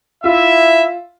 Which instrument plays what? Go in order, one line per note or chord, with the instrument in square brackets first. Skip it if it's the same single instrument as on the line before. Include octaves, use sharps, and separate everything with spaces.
[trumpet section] E4 E5 [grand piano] F4